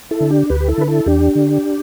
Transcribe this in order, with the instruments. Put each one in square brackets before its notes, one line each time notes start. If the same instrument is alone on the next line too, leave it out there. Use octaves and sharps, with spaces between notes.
[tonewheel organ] E4 A4
D3
D4 G4
D2 G4 B4
G4
E4 A4
D3 B4
E4 A4
E2 D4 G4
D3